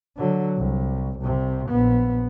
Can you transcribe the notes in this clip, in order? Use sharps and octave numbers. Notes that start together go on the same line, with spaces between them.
D3 F#3
C2
C2 C3
A#1 B3